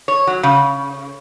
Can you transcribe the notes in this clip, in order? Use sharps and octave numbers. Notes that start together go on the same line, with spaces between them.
C#5
F#3
C#3